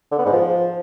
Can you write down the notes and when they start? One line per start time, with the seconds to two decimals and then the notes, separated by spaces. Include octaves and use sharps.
0.12 D3
0.19 B3
0.26 G#2
0.33 F3